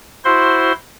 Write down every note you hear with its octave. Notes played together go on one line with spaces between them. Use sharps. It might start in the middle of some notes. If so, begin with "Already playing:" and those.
E4 F#4 C5 C6